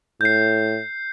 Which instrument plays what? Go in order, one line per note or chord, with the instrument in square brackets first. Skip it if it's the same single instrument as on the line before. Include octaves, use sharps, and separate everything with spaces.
[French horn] A2 [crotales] G6 C7